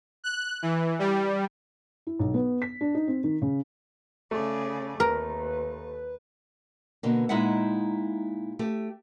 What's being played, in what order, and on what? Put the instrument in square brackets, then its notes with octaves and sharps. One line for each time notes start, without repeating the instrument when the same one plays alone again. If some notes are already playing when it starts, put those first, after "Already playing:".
[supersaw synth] F#6
E3
G3
[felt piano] E4
B1
B3
B6
D4
D#4
C4
D#3
C#3
[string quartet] C#3 G#4 D5 [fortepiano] A3
[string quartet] D#2 [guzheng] A#4 [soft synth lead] B4
[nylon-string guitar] B2 D3 A#3
A#2 G#3 D#4 E4 E5 F#5
A3 G4